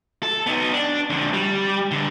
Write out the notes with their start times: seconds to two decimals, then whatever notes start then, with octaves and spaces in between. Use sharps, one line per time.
0.23 A4
0.47 B3 D#4
0.72 D4
1.10 F2 D3
1.34 G3
1.91 G2 D3